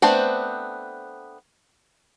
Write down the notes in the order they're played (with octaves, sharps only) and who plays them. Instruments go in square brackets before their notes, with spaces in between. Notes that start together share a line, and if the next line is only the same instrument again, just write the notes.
[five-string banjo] A3 B3 C4 D4 C5